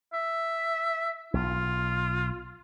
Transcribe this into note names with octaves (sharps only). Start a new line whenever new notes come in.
E5
B1 F4